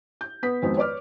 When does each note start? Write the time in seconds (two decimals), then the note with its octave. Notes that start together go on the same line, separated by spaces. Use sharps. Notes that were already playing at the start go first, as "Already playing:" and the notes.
0.21 G6
0.43 B3 B4 B6
0.62 F2 D#3 G#3 B3 C4 F#4
0.76 B4 C#5 D5 D6 F6